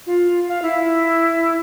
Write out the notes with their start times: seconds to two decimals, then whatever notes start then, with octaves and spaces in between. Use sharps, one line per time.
0.07 F4
0.48 F5
0.62 E4